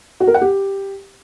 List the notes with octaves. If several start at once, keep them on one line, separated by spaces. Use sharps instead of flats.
F#4
A#4
F#5
G4